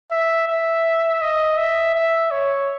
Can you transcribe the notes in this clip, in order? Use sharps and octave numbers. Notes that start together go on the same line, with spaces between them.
E5
E5
D#5
E5
E5
C#5